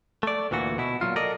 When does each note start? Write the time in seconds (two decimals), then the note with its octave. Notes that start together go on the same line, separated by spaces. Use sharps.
0.23 A3 D5
0.51 D2 A#2 E3 F#4
0.78 B2 E4
1.01 A#2 F#3 F4
1.16 A4 A#4 D5 D#5